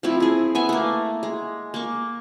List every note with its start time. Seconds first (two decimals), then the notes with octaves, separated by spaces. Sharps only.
0.03 F3 A3 C4 E4
0.20 E4 G#4
0.55 B3 E5 G#5
0.69 A3 A#3
1.23 G#3
1.74 A#3 C#6